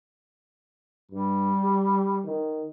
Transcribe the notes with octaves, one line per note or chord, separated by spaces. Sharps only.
G2 G3
G4
D#3